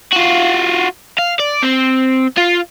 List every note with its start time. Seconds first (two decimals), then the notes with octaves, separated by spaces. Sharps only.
0.12 F4 F#4
1.18 F5
1.39 D5
1.62 C4
2.37 F4